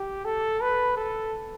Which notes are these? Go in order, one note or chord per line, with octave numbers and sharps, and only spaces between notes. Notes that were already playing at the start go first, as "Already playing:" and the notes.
Already playing: G4
A4
B4
A4